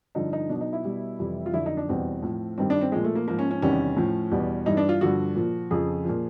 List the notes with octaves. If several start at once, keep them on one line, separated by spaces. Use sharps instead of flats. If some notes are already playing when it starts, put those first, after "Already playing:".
G2 D3 F3 D#4
D#4
B2 F#3 D4
D#4
E4
B2 G3
F2 C3 E3 G3
F4
F2 D3 F#3 E4
D#4
D4
E2 B2 G3 C4
A2 F3
G2 D#3 G3 C4
D4
C4
A#2 F3 G#3
A3
A#3
G#2 F3 A#3
C#4
C#4
E2 C3 D#3 G3 C#4
A2 F3
E2 B2 G3
G2 E3 G3 D#4
D4
F4
G2 D3 F3 F#4
A#2 F3
F2 C#3 F3 G#4
A#2 F3